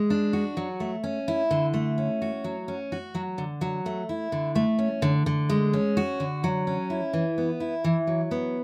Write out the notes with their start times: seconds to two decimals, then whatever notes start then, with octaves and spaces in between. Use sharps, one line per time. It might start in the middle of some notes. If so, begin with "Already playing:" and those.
Already playing: G#3
0.10 D4
0.33 F#4
0.57 F#3
0.80 A3
1.04 C#4
1.28 E4
1.51 D3
1.74 A3
1.98 C#4
2.22 F#4
2.44 F#3
2.68 C#4
2.92 F#4
3.15 F#3
3.38 D3
3.61 F#3
3.86 A3
4.09 E4
4.32 D3
4.56 A3
4.79 C#4
5.02 D3
5.26 D3
5.49 G#3
5.73 C#4
5.97 F#4
6.20 D3
6.44 F#3
6.67 C#4
6.90 E4
7.13 E3
7.38 B3
7.60 E4
7.84 E3
8.07 F#3
8.31 B3